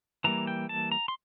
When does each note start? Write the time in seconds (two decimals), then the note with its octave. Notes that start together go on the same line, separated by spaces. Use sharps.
0.24 E3 G3 A#3 A#5
0.47 G5
0.69 A5
0.92 A#5
1.08 C6